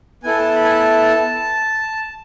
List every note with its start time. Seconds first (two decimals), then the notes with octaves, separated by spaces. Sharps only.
0.23 B3 E4 A4 G#5
0.39 A5
0.56 B5
0.65 G#5
0.71 A5